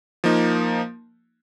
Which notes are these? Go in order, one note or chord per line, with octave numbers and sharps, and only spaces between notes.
F3 A#3 D#4